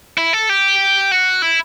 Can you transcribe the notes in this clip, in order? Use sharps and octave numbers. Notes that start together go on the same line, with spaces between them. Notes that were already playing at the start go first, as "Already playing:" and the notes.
E4
A4
G4
F#4
E4